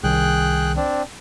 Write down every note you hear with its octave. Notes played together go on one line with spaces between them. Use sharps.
C2 D#3 G#4 G5 F#6
C4 D4